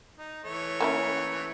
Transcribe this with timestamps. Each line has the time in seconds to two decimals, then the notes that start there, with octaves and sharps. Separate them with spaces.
0.18 D#4
0.44 E3 A3 C#5
0.81 A#3 C#4 E4